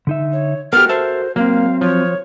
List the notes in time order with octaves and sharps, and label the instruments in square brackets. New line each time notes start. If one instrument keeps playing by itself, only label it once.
[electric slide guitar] D3 D#4 E5
[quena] C#5
[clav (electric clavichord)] B3 G4 [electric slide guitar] F#4 A4 A#4 [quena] F6
[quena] C5 [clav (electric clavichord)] E5 A5
[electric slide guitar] F#3 C4 [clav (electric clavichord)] A#3 [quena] F5
[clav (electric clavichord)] F3 [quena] C#5